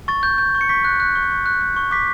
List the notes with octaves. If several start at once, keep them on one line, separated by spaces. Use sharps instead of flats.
C#6 A6
G6
G6
C#6
C#7
C#6 B6
F#6
F#6
C#6
C#6
F#6
F#6
C#6
D6 B6